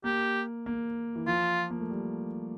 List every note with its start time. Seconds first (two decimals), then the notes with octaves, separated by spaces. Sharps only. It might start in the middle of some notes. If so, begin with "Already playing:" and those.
0.04 A#3 G4
0.66 A#3
1.15 E3
1.27 F3 F4
1.70 A#3
1.79 A3
1.90 G3